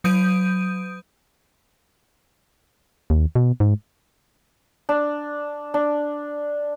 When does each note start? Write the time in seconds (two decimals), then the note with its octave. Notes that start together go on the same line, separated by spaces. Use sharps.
0.04 F#3 D#6 G6 D7 D#7
3.10 D#2
3.35 B2
3.60 G#2
4.89 D4
5.74 D4